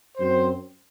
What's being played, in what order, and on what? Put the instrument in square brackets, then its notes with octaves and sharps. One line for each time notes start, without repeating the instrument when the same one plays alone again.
[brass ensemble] F#2 F#3 C4 C5